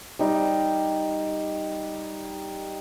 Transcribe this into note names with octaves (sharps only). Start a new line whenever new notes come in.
G3 D#4